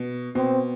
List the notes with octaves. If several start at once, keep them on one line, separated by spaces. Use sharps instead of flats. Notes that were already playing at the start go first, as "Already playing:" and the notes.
Already playing: B2
B2 C4